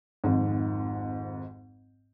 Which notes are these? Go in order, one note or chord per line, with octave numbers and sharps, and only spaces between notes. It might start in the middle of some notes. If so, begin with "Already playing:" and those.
G#1 F2 G#2